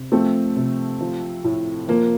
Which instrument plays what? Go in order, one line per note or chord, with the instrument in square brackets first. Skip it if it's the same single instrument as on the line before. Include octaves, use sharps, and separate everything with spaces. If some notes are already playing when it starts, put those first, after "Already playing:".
Already playing: [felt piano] C3
F3 A3 C4
C3
F3
A2
F3 A#3